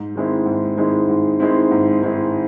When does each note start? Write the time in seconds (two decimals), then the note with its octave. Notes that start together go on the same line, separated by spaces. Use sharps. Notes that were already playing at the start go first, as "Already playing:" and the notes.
Already playing: G#2
0.16 D#3 G#3 C4 E4
0.46 G#2
0.77 D#3 G#3 C4 E4
1.09 G#2
1.40 D#3 G#3 C4 E4
1.71 G#2
2.01 D#3 G#3 C4 E4